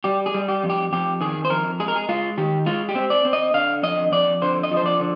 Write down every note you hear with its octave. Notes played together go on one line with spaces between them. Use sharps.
G3 G4
G#4
G3
G4
F2
G4
F2 G4
D#3 G#4
C5
F2 A#4
G#3 G#4
A#4
G#4
G#3 F4
D#3 G4
G#3 F4
G4
C4
D5
C4
D#5
D3 F5
F2 D#5
F2 D5
D3 C5
D#5
F3
C5
D5
D3